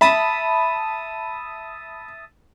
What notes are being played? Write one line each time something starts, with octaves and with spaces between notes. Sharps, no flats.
E5 A5 B5 D#6